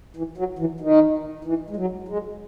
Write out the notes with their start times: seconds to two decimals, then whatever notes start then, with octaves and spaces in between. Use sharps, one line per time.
0.17 E3
0.38 F#3
0.59 E3
0.80 D#3
1.45 E3
1.70 G#3
1.76 F#3
2.08 G#3